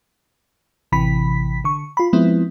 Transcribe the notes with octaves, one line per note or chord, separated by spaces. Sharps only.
A1 C3 E3 B5 B6
D3 C#6
F4 B5
F3 G#3 B3 C4 E4